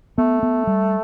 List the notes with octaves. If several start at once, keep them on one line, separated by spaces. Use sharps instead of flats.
A3 B3
B3
G3